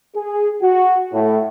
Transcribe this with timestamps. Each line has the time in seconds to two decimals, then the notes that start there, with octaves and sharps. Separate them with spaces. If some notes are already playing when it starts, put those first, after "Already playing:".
0.16 G#4
0.62 F#4
1.13 A2